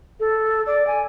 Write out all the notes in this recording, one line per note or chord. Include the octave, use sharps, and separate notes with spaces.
A4
D5
G#5